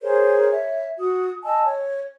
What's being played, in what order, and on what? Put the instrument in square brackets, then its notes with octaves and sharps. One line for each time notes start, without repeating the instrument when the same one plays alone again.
[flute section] G#4 A#4 C5 C#5
C#5 E5
F#4 D#6
D#5 G#5 A5 E6
C#5